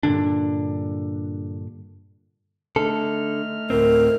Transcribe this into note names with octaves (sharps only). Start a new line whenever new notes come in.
G2 A#2 D3 D4
D3 A3 D#4 A4 F6
D2 A2 C4 A#4